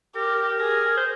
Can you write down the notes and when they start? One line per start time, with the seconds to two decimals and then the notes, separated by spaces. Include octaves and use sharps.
0.15 G4 A#4
0.59 G#4 A#4
0.97 C5